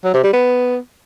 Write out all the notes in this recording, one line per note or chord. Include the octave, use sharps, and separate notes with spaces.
F#3
C3
G3
B3